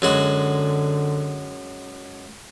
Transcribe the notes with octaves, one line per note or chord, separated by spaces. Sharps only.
F#2 D3 G#3 F#4